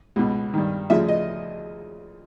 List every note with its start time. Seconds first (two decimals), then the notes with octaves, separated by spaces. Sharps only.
0.16 C#2 B2
0.54 G2 D#3
0.90 D2 C#3 F3 E5
1.08 D#5